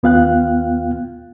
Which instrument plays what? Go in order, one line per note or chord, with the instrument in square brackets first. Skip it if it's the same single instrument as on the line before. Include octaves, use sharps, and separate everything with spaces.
[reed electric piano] D#2 B3 F4 F5 G5 F#6